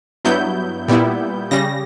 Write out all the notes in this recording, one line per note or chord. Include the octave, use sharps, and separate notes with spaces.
G2 F#3 B3 E4 G6
A#2 G3 B3 E4
C#3 G3 A#6